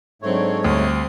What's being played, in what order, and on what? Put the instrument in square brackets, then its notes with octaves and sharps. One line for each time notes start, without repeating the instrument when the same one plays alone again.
[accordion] G#2 A3 C#5 [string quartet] F#3 C4 D4
[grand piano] D2 [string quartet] G3 C4 D#6